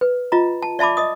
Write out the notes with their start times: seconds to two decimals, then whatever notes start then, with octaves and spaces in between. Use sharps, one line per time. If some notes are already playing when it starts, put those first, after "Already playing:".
0.01 B4
0.32 F4 D#5 A#5
0.62 A5
0.79 D5 E5 A5 B5 D6
0.97 D#5 D#6